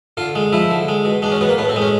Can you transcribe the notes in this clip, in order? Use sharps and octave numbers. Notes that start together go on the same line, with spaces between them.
D3 F4
G#3
F3 E4
D3
G#3
B2
G#3 D4
C#4
B2 B3
A#3
A2 B3
C4
G#3
C#4